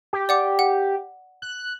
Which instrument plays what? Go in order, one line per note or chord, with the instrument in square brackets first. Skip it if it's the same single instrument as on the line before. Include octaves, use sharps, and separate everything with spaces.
[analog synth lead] G4
[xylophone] D5 F#5 D6
F#5
[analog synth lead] F#6